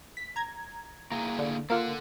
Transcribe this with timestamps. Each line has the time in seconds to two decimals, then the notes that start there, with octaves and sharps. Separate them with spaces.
0.17 B6
0.36 A#5 G#6
1.11 A#3 E4 G#4 A#5
1.39 D3
1.70 A#3 F4 A4 F5 F#5